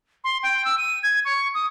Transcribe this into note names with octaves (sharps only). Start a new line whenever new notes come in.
C6
G5
E6
D#7
G#6
C#6
D#6